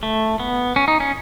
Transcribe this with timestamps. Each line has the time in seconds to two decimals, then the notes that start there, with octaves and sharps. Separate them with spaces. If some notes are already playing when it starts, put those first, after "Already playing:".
0.03 A3
0.40 B3
0.76 C#4
0.88 D#4
1.00 C#4